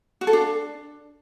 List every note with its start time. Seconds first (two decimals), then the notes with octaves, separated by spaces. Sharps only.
0.21 F#4
0.27 A4
0.33 D4